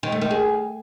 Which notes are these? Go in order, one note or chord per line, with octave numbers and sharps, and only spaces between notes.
D#3
A3
D#3
G#4